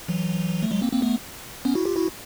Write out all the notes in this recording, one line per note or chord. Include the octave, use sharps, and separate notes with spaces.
E3 F#3
A3
F#3 G#3
A#3 C4
A#3 C4
A3 B3
B3 C#4
E4 F#4
F4 G4
E4 F#4